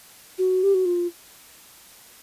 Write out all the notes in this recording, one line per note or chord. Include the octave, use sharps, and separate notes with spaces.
F#4
G4
F#4
F4